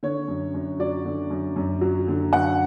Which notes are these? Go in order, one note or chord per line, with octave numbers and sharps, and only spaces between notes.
D3 C#5
F#2
F#2
F#3 D5
D3
F#2
F#2
F#3
D3
F#2 F#5